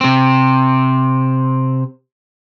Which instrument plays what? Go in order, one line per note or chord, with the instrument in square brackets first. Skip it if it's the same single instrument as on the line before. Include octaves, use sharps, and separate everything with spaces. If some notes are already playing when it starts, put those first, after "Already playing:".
[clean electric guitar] C3 C4